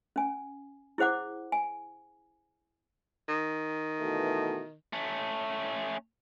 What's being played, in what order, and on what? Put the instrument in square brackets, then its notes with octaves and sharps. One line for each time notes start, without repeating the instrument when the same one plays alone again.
[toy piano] C#4 G#5
E4 G#4 C5 F#5 D6
G#5
[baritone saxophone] D#3
[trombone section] B2 E3 A3
[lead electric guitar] A3 C#4